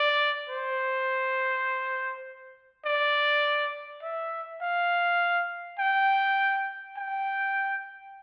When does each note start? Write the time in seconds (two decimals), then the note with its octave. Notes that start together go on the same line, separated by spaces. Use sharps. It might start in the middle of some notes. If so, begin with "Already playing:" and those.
Already playing: D5
0.49 C5
2.85 D5
4.03 E5
4.61 F5
5.79 G5
6.97 G5